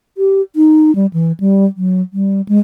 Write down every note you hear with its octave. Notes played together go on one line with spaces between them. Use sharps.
G4
D#4
G3
E3
G3
F#3
G3
G#3